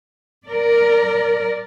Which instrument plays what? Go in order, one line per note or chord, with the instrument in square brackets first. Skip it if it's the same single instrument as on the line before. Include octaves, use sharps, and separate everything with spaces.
[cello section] A#4 D5